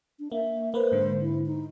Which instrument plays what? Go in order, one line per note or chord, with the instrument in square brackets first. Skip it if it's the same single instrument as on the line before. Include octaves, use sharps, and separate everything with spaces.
[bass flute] D4
[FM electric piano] A#3 [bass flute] E5
[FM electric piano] A#3 B4 [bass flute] C5
[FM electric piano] G#2 D3
[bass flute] E4
D#4